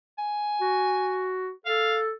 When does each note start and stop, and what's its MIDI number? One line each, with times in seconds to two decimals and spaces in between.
0.18 1.36 80
0.61 1.51 66
1.66 2.11 69
1.66 1.97 77